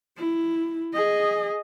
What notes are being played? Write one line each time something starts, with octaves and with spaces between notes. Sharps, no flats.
E4
G#4 D#5